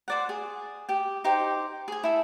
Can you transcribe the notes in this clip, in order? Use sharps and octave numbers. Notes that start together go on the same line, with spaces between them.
C5 D5 F#5
G#4
G4 G5
D#4 G4 C5 G5
G#4 G#5
E4 A4